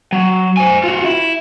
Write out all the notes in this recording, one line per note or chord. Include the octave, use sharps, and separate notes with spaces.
F#3
C5 G#5
F4 F#4
E4